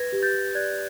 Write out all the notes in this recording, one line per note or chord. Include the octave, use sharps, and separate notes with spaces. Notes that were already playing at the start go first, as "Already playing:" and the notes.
Already playing: B4 G#6 A#6
G4
G6 A6
G4
D5 F#6 G#6